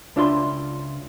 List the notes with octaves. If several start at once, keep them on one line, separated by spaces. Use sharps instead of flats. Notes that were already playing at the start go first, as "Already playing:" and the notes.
C#2 D4 F4 E5 A#5 C6